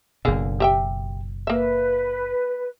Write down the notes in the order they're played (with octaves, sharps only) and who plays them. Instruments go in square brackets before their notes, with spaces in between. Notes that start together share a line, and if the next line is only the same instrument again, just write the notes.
[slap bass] F#1 B2 [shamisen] D3 A#3 G#4
[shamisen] G4 E5 G5
[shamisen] A#3 E5 [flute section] B4